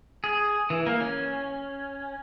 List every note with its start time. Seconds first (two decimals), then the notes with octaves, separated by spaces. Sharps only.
0.24 G#4
0.70 E3
0.86 A#3
1.00 C#4